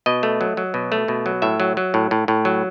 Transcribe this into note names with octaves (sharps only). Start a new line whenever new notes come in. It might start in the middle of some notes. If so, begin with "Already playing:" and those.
B2 D#5
A3
F#3
F#3
B2
A3
B2
F#3
A2 E5
F#3
F#3
A2
A2
A2
F#3